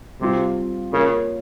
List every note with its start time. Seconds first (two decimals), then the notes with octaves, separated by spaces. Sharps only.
0.21 C3 G3 C4 F4
0.93 C#3 A#3 F4 A#4 C#5